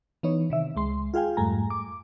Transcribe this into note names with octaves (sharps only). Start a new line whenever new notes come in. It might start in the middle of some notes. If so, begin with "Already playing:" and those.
E3 B3 D#4 C#5
C3 D#3 E5
C#2 G#3 C6
F4 G#4 F5 G5 G#5
F2 G#2 G3 A3 G#5 A#5
D6